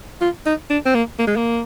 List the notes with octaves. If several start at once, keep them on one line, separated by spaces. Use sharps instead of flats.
F4
D#4
D4
C4
A#3
A#3
G#3
A#3